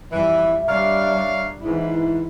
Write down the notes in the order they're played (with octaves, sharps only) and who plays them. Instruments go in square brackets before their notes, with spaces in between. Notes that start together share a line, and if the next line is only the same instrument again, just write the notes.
[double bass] F2 G3 [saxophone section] E3 [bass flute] E5
[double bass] G3 D4 [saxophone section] A#4 C#5 F5
[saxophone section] G#2 [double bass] E3 E4